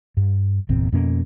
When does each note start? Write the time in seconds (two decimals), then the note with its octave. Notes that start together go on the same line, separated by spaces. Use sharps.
0.17 G2
0.69 G1 E2 A#2 C4
0.92 F2 B2 A#3 C#4